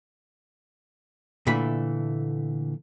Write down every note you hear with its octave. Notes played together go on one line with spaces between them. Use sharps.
A#2 D3 E3 A3 B5